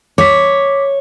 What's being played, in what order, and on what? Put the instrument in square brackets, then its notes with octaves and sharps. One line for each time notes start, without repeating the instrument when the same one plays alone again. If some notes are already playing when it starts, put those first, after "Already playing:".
[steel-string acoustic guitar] C#5 [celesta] D6 B6